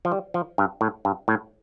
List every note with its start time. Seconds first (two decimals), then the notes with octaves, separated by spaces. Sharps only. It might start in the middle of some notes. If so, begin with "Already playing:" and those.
0.05 F3
0.12 G3
0.34 F3
0.58 G2
0.81 A2
1.05 G2
1.28 A2